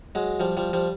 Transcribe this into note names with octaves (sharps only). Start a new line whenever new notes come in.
F#3 G#3
F3 G3
F3 G3
F3 G3